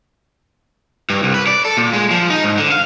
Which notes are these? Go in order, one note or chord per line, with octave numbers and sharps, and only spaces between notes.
G2
C2
B4
D5
A4
A#2
G#3
F3
D#4
G#2
D3
F5